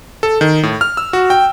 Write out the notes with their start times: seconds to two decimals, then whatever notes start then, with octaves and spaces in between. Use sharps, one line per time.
0.23 A4
0.41 D#3
0.63 A2
0.81 F6
0.97 E6
1.13 F#4
1.30 G5